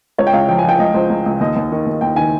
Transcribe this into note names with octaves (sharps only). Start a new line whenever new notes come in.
C#2 C#5
G5
C#2 F5
F3 G5
G#5
F3 G5
C#2 D#5
C#2 C5
C#2
C#2
D#2 D#5
D#2
D#3
D#2
D#2 G5
D#3 G#5